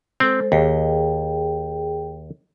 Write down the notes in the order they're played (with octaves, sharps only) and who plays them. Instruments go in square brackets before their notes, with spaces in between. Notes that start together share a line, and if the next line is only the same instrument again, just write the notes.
[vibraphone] G#3 A4 C5 [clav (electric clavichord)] C4
[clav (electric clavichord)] D#2 [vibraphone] G#4 G5